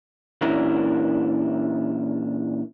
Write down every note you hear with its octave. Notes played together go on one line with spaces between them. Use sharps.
A#2 E3 C#4 D4 E4 A#4